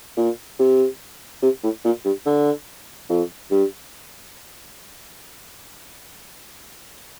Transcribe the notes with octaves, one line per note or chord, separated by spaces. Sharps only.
A#2
C3
C3
A2
A#2
G2
D3
F2
G2